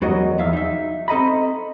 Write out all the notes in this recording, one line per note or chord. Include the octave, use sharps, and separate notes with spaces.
E2 F#3 F#4 A#4 D#5
E2 F3 E5 F5
D#4 E5
C4 A4 D#5 A#5 B5